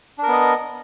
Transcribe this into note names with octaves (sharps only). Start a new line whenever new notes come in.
B3 D4 A#4 D#5